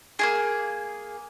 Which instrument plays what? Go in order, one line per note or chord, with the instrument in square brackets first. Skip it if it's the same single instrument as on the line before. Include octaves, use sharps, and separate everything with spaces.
[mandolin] A#3 E4 G#4